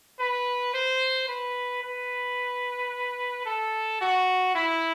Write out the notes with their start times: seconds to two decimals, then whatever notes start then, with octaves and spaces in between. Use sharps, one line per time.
0.20 B4
0.74 C5
1.28 B4
1.83 B4
3.46 A4
4.01 F#4
4.55 E4